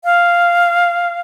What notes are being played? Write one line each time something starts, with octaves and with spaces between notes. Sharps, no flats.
F5